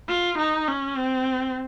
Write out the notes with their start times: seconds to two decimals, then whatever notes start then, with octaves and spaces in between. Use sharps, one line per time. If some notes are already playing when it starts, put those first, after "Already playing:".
0.09 F4
0.38 D#4
0.68 C#4
0.98 C4